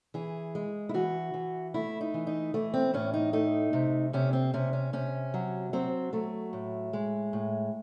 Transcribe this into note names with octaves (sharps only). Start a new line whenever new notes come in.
E3 G#4
G#3
E4
E3 F#4
E3
A3 E4
D#4
E3
D#4
E3 A3
C4
A2 C#4
D#4
A3 D#4
C3
C3 C#4
C4
C3 C#4
C#4
C3 C#4
F#3
F#3 C4
F#3 A3
A2
G#3
A2